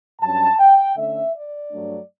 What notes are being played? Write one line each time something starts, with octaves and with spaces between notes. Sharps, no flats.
G2 F#3 C#4 A5
G5
D3 A3 C#4 E5
D5
G2 F#3 A3 D4